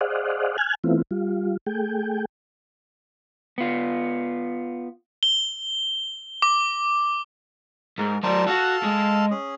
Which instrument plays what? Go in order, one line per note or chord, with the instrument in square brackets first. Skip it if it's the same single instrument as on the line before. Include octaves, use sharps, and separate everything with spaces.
[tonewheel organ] G#4 C5 D5 D#5 F5 F#5
G#5 F6 F#6 G#6
E3 A3 B3 C4 E4 F4
G3 F4
A3 G#4 G5
[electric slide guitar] B3 F4
[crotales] G7
D6
[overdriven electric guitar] G#2 [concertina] A#4
[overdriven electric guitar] F#3 D5 [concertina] A#4 C5 A5
[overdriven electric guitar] F#4 F#5 [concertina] A4 F5 A5
[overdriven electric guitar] G#3
[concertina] C#4 G#4